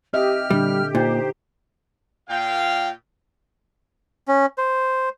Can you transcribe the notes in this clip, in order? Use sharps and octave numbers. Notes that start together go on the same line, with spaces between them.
C4 G4 D#5 E5 F6
A#2 D3 G3 D4
A#2 D#4 C5
A#2 F5 G5
C#4
C5